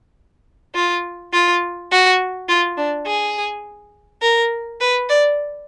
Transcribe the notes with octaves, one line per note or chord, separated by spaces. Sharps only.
F4
F4
F#4
F4
D4
G#4
A#4
B4
D5